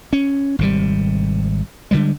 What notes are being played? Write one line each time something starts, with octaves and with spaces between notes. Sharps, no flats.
C#4
G#1 C3 G3
D3 E3 G3 G#3